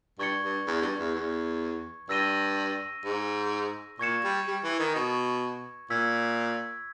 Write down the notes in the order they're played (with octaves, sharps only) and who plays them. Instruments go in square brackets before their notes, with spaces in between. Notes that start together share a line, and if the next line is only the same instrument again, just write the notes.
[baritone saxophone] G2 [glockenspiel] C#6 G#6 C#7 G7
[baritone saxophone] G2
E2
G2
E2
E2
[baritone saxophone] G2 [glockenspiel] E6 A#6 D#7 G7
[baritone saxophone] G#2
[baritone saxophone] A#2 [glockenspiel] C#6 G#6 C#7 E7
[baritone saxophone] G3
G3
E3
D#3
B2
[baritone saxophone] A#2 [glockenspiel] E6 G#6 B6